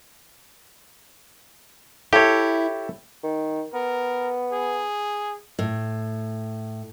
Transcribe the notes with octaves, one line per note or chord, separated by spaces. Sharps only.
E4 G4 A4 C#5 E5
D#3
B3 A#4
G#4
A2